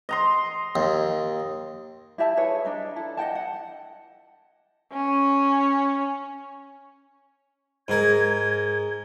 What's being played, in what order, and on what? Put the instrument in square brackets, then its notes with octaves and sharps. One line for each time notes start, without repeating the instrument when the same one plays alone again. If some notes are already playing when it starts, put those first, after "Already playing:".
[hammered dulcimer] D#5 A#5 C6
[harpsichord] D#2
[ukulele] E4 G4 E5 A5
G#4 B4 C#5 E5
D4 D#5 A#5
E4 A4
D#5 F#5 G5 A5
F#5
[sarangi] C#4
[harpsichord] G#2 A#4 [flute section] G#6